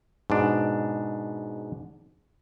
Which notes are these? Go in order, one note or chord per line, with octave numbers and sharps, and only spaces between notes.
G#2 B2 D4